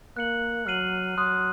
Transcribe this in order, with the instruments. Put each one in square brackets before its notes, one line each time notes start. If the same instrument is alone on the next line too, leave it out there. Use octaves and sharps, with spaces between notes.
[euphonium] A#3 [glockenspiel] F#6 C#7 F#7
[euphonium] F#3 [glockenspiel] F6 C7 D#7 F#7
[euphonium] F#3 [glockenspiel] C6 D#6 F#6